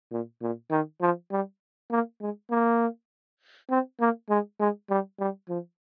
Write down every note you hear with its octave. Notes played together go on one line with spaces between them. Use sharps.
A#2
A#2
D#3
F3
G3
A#3
G#3
A#3
C4
A#3
G#3
G#3
G3
G3
F3